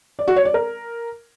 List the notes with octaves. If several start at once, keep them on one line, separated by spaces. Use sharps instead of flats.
D5
F#4
C#5
D5
A#4